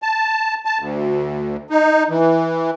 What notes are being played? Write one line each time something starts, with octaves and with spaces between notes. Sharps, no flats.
A5
A5
D2
D#4
E3